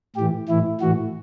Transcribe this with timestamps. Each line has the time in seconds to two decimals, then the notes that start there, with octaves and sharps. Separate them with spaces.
0.16 A2 E3 G4
0.48 A2 E3 E4
0.81 A2 E3 F#4